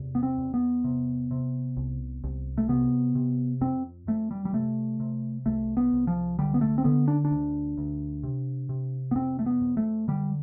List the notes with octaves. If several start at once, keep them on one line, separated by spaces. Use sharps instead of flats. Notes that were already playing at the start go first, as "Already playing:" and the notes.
Already playing: E2 C3
B3
C4
E2
B3
C3
C3
C2
C2
A3
C3 B3
C3
F2 C4
F2 A3
G3
G3
C3 A3
C3
C2 A3
B3
C2
F3
D3 G3
B3
A3
C4
D3 B3
D4
D4
D2
D2
C3
C3
B3
F2 C4
A3
B3
F2
A3
D3 G3